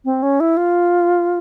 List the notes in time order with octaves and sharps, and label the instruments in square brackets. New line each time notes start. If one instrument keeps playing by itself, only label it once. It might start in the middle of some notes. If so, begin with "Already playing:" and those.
[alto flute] C4
C#4
E4
F4